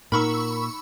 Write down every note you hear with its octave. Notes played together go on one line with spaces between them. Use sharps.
A#2 D#4 A#4 F#5 B5 C#6 E6 F6